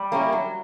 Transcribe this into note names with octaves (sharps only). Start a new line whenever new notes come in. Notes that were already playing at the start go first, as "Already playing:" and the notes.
Already playing: G3
A#3 C#4 E4 G4
F#3